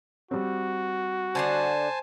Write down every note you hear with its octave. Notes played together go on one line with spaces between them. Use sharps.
G3 C4 F#4
D3 D4 C5 F#5 G#5 A5